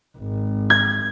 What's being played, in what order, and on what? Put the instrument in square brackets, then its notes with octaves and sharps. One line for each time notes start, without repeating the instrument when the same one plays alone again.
[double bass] G#1
[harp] G#6